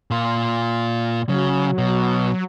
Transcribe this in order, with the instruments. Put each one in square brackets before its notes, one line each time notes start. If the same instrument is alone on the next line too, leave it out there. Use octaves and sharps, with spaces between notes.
[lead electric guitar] A#2 F4
[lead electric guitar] C#3 [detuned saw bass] F#3
[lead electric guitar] B2